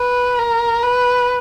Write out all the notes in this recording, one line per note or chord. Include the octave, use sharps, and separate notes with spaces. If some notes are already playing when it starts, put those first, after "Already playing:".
Already playing: B4
A#4
B4